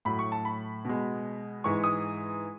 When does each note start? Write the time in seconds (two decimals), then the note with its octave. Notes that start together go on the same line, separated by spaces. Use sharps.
0.05 A2 F#3 B5
0.19 C#6
0.32 A5
0.45 B5
0.85 B2 G#3
1.64 G#2 E3 G#3 C#6
1.84 D#6